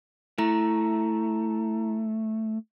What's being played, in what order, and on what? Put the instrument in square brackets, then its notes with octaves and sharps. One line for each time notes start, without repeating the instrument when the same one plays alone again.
[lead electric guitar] A3 [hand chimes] E4 A#5